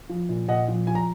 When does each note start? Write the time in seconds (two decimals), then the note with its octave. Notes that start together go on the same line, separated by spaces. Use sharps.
0.09 F3
0.29 A#2
0.48 A#2 D#5 F#5
0.68 F3
0.87 F3 G#5
0.95 A#5